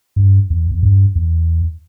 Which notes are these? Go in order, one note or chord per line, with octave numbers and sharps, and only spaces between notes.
G2
E2
E2
G2
E2